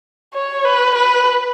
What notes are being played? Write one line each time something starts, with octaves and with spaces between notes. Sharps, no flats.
C#5
B4
B4